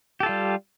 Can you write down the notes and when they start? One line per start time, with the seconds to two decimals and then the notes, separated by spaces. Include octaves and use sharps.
0.20 G4
0.23 A4
0.26 F4
0.29 G3